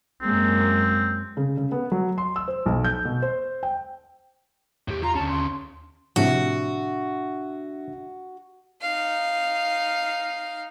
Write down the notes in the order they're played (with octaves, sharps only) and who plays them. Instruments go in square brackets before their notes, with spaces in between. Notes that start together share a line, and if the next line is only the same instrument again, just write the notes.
[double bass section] F#2 G#3 A#3 [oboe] C4
[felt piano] C#3
C#3
B3
F#3
C6
E6
C5
B1
G6
B2
C5
G5
[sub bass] E2 [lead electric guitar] A2 G4
[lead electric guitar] F4 [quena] A#5
[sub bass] D#2 [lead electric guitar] D3 C#4 [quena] A5
[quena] C6
[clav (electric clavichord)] A2 C3 F3 [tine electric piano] D4 E5 [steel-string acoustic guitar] F#4
[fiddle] D#4 F5